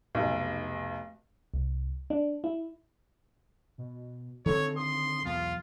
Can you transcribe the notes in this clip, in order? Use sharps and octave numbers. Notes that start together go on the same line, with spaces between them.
F1 B1
C2
D4
E4
B2
D3 D#3 C4 A4 C#5
C6 D#6
B1 E2 F4